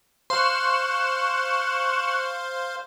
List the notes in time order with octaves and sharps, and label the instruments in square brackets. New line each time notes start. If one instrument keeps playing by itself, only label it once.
[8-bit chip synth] C5 F5 [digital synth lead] C6 [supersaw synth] C#6 F#6 E7